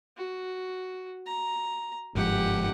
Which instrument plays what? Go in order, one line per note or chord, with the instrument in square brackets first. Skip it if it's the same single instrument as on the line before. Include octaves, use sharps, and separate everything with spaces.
[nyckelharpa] F#4
A#5
[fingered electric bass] G1 G#2 F3 [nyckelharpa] G4 F#5